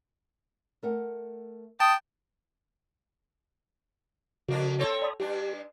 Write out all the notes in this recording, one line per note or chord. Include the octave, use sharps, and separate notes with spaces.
A3 A#4 F#5
G5 A5 D#6
F2 C#3 A#3 D4 F#4
C4 A4 C#5
D5 B5 D#6
G2 D4 G4